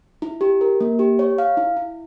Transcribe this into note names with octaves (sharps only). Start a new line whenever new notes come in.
E4
G4
A#4
A#3
G4
C#5
F5
E4
E4